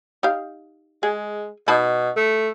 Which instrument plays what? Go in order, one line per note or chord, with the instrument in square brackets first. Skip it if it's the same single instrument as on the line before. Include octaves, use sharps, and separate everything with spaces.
[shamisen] D#4 G4 F5
[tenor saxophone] G#3 [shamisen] G#4
[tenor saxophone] B2 [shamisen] D#4 A5 B5
[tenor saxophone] A3